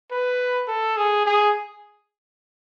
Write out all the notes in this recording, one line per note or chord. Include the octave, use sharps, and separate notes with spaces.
B4
A4
G#4
G#4